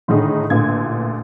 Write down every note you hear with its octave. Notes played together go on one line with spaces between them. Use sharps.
A2 D3 D#3 G#3 D#4 G#4
A1 A#2 D3 G#6